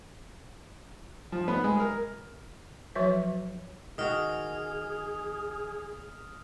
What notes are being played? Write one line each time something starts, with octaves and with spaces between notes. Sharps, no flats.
F3
B3
G#3
A#4
F3 F#3 F#4 B4 C#5 E5
D#3 F#4 G#4 D#6 F6